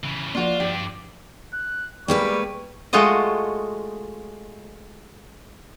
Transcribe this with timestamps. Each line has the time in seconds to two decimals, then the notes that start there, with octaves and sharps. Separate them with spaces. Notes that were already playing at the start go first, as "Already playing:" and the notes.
0.04 C#3 E3
0.35 F3 A#3 D4 F4 F#4
0.60 G2 F3 D4 G4 D#7
1.53 F#6
2.08 G3 G#3 A#3 B4 C#6
2.93 G#3 A3 F4 F#4 D#5